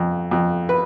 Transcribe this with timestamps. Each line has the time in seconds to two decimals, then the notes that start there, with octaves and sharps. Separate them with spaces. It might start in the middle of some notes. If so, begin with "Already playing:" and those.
Already playing: F2
0.31 F2
0.69 B4